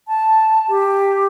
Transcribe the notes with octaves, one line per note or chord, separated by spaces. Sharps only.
A5
G4